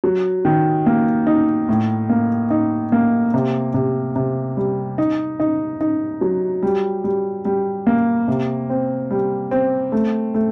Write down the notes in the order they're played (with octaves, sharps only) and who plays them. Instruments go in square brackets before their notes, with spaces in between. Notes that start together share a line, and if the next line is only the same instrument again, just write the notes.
[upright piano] F#3
D#3
A#3
D#4
A2
A#3
D#4
A#3
C3
C3
C3
G3
D#4
D#4
D#4
F#3
G3
G3
G3
A#3
C3
C4
G3
C4
A3
A3